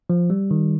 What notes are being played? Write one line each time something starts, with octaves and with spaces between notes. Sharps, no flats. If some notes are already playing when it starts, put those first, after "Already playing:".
F3
G3
D#3